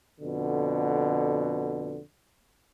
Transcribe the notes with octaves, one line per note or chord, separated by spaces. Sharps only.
F2 B2 D3